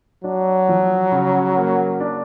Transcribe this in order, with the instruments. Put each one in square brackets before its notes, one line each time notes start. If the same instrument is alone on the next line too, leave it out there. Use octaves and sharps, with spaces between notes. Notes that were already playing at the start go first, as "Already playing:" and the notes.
[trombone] F#3 [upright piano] D4
[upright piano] F3
C#3
A#3
D4